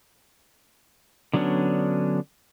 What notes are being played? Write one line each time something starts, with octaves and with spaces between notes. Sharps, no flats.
D3 F#3 B3 C#4 D4